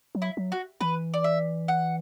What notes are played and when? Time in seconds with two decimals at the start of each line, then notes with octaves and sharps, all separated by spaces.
0.15 F#3
0.22 E4
0.37 F#3
0.52 F#4
0.81 E3 B4
1.14 D5
1.24 E5
1.68 F#5